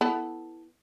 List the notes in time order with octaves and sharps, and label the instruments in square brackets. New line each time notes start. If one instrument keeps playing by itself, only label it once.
[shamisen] B3 E4 A4